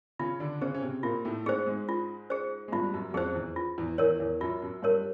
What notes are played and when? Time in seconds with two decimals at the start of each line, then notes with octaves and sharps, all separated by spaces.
0.19 C#3 C#4 F4
0.40 D3 D4
0.61 C#3 C#4 G#4 C5
0.74 C#4
0.82 C3 C4
1.03 A#2 A#3 F4
1.25 A2 A3
1.45 G#2 G#3 G#4 C5
1.66 G#2 G#3
1.89 F4
2.30 G#4 C5
2.68 G#3
2.72 G2 G3 F4
2.83 G3
2.93 F#2 F#3
3.11 F#3
3.14 F2 F3 G#4 C5
3.35 E2 E3
3.56 F4
3.78 E2 E3
3.98 E2 E3 A#4 C#5
4.20 E2 E3
4.41 F#2 F#3 F4
4.62 F#2 F#3
4.83 G2 G3 A#4 C#5